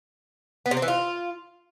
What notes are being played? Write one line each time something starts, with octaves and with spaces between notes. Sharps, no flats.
B3
C3
C4
E3
F4